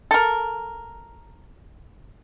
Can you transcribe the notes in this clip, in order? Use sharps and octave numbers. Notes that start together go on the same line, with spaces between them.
A4 A#4